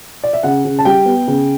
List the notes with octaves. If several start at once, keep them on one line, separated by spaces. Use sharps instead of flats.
D5
E5
C#3 F#5
C#3
A5
G3 G5
B3
C#3